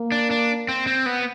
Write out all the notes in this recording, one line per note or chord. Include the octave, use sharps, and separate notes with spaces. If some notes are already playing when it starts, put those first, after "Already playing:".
Already playing: A#3
D4
D4
C4
C4
B3